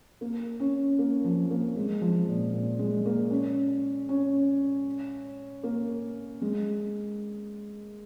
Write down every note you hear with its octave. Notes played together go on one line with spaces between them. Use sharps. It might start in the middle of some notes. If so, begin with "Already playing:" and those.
A#3
C#4
A#3
F3
A#3
G#3
F3
A#2
A#2
G#3
A#3
C#4
C#4
A#3
G#3